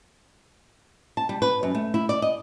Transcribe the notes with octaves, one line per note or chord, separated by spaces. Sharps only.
A5
G3
B4
F#2
A3
E4
D5
D#5